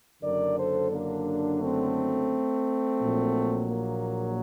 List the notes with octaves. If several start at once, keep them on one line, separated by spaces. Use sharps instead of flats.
F#1 F#2 D3 F#3 A#4 D5
A4 C5
A#3 D4
A3 C4
A#1 A#2 F#3
A#3